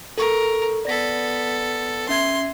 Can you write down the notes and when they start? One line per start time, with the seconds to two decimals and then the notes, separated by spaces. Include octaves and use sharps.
0.18 A4 A#4 C#6
0.85 B3 A4 D5 A#6 B6
2.09 C#4 E5 C6 G#6